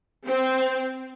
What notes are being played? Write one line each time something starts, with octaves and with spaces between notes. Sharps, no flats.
C4